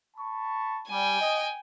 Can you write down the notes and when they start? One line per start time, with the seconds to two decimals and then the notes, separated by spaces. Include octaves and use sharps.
0.17 A5 B5 C#6
0.90 G3 G5 G#5
1.21 D#5